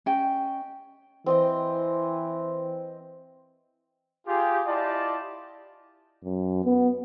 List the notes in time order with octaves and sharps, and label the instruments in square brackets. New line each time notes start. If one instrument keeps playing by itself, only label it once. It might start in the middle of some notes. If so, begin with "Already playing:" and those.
[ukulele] C#4 D#5 G5
[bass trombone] E3 [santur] C4 D#5 G5
[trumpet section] F4 G4 G#4
E4 F4 G4 D5 D#5 A5
[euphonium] F#2
B3